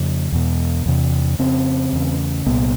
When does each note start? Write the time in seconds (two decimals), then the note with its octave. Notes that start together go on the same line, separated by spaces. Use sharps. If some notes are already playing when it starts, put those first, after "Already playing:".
Already playing: F2 C#3
0.32 E2 B2
0.86 E2 C3
1.39 F2 C#3 C4
1.93 E2 C#3
2.47 C2 A#2 B3